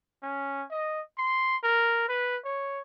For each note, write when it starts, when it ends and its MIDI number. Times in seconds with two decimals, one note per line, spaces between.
0.23 0.64 61
0.71 1.01 75
1.18 1.57 84
1.64 2.04 70
2.09 2.37 71
2.45 2.81 73